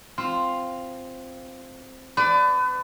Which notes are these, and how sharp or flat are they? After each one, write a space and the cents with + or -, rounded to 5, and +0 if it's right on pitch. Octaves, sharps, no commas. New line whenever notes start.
C4 +0 F4 +0
B4 +35 D5 +0